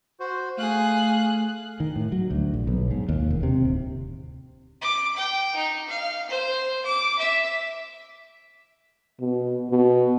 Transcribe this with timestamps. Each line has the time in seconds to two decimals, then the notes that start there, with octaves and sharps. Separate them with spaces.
0.20 F#4 C5
0.58 A3 G#4 F5 F#6
1.80 D#3
1.96 A2
2.12 F#3
2.31 D2
2.54 A#1
2.67 B1
2.91 G#2
3.09 D#2
3.31 E1
3.43 C3
3.64 D1
4.81 D6
5.16 G5
5.55 D#4
5.89 F5
6.29 C5
6.85 D6
7.18 E5
9.21 B2
9.70 B2